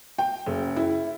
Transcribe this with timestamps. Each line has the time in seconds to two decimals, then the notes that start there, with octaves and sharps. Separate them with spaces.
0.18 G5
0.46 F#1
0.76 E4